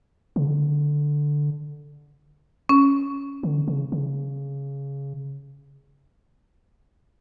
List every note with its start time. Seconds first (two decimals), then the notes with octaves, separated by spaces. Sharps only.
0.36 C#3
0.46 D3
2.69 C#4
3.43 D3
3.68 C#3
3.92 C#3